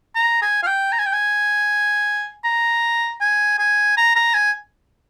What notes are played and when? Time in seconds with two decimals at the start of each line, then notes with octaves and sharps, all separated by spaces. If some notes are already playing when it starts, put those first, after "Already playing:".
0.15 A#5
0.42 G#5
0.63 F5
0.67 G5
0.92 A#5
0.99 G#5
1.06 G5
1.13 G#5
2.44 A#5
3.21 G#5
3.59 G#5
3.97 A#5
4.16 A#5
4.34 G#5